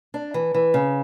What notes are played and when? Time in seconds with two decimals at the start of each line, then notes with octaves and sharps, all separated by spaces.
0.14 D4
0.34 E3
0.54 E3
0.74 C#3